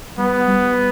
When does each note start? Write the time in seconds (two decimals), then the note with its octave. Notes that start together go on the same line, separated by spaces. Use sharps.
0.18 G3 B3
0.47 G3